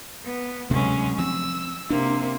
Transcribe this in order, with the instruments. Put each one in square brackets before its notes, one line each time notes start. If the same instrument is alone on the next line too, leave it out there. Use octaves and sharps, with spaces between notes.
[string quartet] B3
[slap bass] D2 C3 A3 [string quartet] F#3 G#3 C#4
[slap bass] F3 C4 [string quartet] E6
[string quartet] C3 A#3 [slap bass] D4